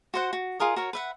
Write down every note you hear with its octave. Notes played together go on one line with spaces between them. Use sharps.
F#4 C5 F#5
F#4
F4 G#4 A#4 D#5
F#4 A#4 C#5
B4 E5 F#5